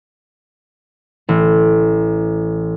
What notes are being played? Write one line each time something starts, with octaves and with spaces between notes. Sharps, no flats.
A1